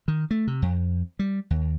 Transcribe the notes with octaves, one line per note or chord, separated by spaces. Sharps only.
D#3
A3
C3
F2
G3
D#2